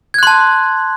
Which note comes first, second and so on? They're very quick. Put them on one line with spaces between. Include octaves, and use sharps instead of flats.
G#6 F#6 C6 A5